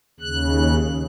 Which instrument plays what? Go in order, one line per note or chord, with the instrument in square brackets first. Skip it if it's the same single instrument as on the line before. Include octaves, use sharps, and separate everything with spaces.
[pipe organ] D#2 C#3 F#6